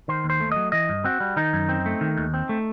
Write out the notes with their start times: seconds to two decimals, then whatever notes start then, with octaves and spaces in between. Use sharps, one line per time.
0.08 D#3 C5
0.24 D#2
0.30 C5
0.40 A3
0.52 F#3 D#5
0.72 E3 D#5
0.89 G2
1.04 C4 F#4
1.20 G3
1.36 D#3 D#4
1.53 F#2
1.69 C4
1.86 A3
2.01 D#3
2.17 D#2
2.34 C4
2.49 A3